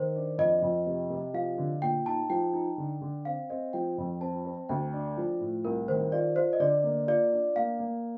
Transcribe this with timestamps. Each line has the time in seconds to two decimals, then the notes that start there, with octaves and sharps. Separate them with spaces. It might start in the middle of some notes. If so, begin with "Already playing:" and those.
Already playing: D#3 C5
0.15 D4
0.38 F2 D#5
0.62 F2
0.86 C3
1.10 C3
1.34 F3 F5
1.58 D3
1.82 A#2 G5
2.06 D#4 A5
2.29 F3 G5
2.53 D#4
2.78 D3
3.01 D3
3.25 C4 F5
3.50 C4 D#5
3.73 F3 G5
3.98 F2
4.21 C4 A5
4.45 C4
4.69 D2 G5
4.93 D4
5.17 F3
5.40 A2
5.65 C2 A#4
5.88 D#3 C5
6.12 F4 D5
6.36 F4 C5
6.53 D#5
6.60 D3 D5
6.84 A#3
7.08 F4 D5
7.32 D4
7.56 A#3 F5
7.79 A#3